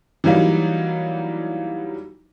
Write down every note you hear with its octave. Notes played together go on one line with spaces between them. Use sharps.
E3 F#3 G3 A#3 D#4